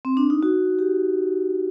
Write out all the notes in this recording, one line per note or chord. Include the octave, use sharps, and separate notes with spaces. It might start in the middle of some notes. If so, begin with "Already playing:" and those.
C4
D4
D#4
F#4
G4